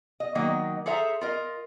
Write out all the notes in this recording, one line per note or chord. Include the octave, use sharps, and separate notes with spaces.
D#5
D#3 F#3 A#3 D#5
G#4 A4 C5 E5 A#5
F4 A#4 D#5